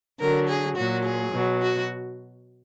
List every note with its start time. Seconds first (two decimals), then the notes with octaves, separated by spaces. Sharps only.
0.20 D3 F#3 A#4
0.49 G#4
0.77 A#2 F#3 F#4
1.05 G#4
1.34 B2 F#3
1.62 F#4